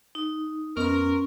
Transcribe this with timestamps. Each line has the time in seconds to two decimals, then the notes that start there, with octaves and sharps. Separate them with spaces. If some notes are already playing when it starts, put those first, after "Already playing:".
0.15 D#4
0.77 F2 B3 C#4 A#4 D#5 C6